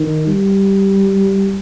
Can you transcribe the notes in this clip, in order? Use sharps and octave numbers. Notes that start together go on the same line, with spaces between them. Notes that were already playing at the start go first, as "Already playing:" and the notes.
Already playing: D#3
G3